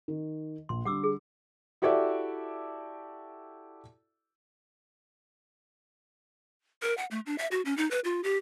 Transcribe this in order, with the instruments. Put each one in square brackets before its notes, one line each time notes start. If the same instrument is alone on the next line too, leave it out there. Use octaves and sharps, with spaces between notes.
[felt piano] D#3
[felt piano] A#1 [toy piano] C6
[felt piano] D3 G3 [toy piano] F#5 D6 E6
[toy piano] G#4
[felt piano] E4 F#4 G4 A4 D5 E5
[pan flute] A#4
F#5
A3
D4
E5
F#4
C#4
D#4
B4
F4
G4